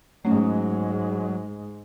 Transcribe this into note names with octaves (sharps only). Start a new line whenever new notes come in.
G#2 F#3 G#3 A3 C#4